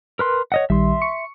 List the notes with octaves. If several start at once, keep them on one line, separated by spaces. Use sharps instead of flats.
A#4 B4 C6
C#5 D#5 F#5
A#1 D#3 G3 E5 C6
C#6 C#7